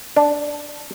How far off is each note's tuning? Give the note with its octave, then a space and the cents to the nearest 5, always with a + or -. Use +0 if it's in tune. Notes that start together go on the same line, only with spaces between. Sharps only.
D4 +0